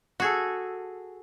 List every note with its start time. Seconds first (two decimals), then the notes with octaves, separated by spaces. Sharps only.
0.20 F#4 G#4 A4